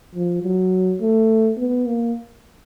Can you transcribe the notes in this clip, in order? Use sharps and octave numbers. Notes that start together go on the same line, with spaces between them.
F3
F#3
A3
B3
A#3